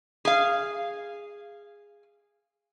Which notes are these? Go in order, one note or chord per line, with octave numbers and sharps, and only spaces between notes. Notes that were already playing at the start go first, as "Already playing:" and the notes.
G#4 F5